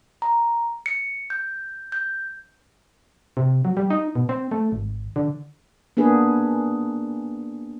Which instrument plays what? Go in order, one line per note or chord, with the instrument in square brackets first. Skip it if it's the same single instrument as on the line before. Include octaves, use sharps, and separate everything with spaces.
[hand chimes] A#5
C#7
G6
G6
[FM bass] C3
F#3
G3
D#4
B2
C4
A3
G#1
D3
[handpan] A#3 B3 D4 G#4 B4